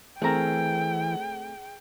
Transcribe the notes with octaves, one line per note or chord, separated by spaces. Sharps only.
E3 A3 C4 G#4 A#4 G5 A#5